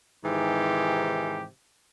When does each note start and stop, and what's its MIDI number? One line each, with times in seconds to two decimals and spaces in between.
0.24 1.47 44
0.24 1.47 48
0.24 1.47 51
0.24 1.47 52
0.24 1.47 67